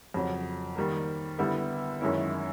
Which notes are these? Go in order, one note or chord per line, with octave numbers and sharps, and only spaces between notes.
F2 C#3 F#3
D#3 G3 A#3
D3 G3 B3 E4
F#2 D#3 G#3 C#4 E4